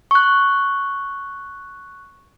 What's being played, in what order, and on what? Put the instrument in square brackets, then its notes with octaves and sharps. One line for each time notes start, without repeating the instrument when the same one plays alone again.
[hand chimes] C#6 F#6